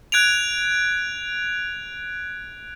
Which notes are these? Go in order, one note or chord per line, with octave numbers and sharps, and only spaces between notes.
F#6 G#6 D7 F7